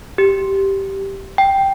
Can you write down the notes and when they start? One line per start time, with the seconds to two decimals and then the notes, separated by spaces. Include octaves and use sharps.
0.18 G4
1.38 G5